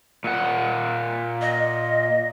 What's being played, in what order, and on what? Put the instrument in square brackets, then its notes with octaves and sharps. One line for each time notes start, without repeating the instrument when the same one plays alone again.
[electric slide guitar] A#2 F#5
[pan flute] D#5